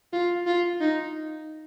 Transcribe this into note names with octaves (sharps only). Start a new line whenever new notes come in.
F4
F4
D#4